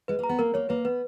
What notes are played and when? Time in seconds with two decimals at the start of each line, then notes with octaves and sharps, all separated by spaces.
0.08 G#3 B4
0.19 A#3 A#5
0.29 B3
0.39 A#3 A#4
0.54 A#3 C#5
0.69 A#3 B4
0.85 B3 B4